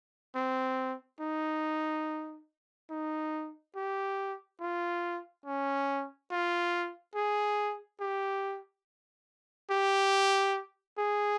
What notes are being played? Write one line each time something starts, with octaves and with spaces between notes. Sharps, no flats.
C4
D#4
D#4
G4
F4
C#4
F4
G#4
G4
G4
G#4